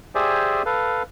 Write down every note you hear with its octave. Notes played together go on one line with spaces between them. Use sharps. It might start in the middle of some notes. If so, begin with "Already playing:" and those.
G4 G#4 C5 D5 E5 G#5
A4 B4 F5